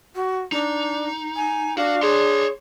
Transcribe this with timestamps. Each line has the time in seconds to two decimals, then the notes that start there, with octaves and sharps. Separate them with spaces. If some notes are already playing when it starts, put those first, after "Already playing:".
0.15 F#4
0.52 D4 D#4
1.36 G#5
1.78 D4 F#4 F5
2.03 G#4 C#5 C6